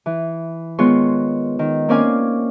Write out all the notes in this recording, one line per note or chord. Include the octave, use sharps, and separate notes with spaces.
E3
D#3 G#3 B3 F4 C#5 C6
D#3
A#3 C4 C#4 D5 F5 G#5